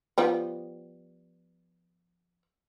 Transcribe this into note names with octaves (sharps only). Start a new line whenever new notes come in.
F3 G3 B3